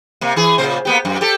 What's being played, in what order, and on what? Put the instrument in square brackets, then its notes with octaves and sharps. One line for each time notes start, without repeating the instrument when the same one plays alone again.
[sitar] C3 A#3
E3 G#4
A#2 C#3 C5
A#3 B3 G4
F#2
G4 A4